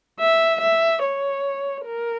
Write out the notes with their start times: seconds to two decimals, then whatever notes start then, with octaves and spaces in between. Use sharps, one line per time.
0.20 E5
0.61 E5
1.03 C#5
1.87 A#4